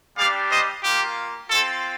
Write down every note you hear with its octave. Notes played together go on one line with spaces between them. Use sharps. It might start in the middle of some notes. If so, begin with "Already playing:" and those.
G3 D4 G4 D5 F5
C5 D#5
A#3 F4 G4
C4 F4 A4